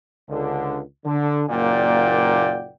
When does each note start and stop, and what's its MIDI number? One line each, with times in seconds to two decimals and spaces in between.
0.29 0.79 37
0.29 0.79 50
1.05 1.44 50
1.49 2.71 30
1.49 2.71 46
1.49 2.71 58
1.49 2.71 74
1.49 2.71 78
1.49 2.71 79